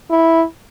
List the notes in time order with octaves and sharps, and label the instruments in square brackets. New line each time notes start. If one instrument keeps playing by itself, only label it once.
[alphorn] E4